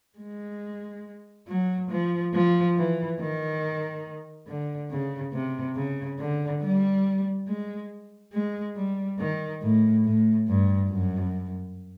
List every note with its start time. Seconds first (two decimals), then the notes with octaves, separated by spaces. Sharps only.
0.19 G#3
1.48 F#3
1.90 F3
2.34 F3
2.77 E3
3.20 D#3
4.47 D3
4.90 C#3
5.33 C3
5.76 C#3
6.19 D3
6.62 G3
7.48 G#3
8.33 G#3
8.76 G3
9.19 D#3
9.62 A2
10.04 A2
10.47 G2
10.90 F#2